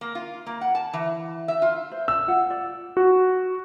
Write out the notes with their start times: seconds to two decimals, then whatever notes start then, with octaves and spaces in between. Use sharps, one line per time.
0.01 A#3
0.15 F4
0.46 A#3
0.61 F#5
0.75 A5
0.93 E3
1.48 E5
1.62 F4
1.91 C5
2.08 E6
2.28 F4 F#5
2.50 D5
2.97 F#4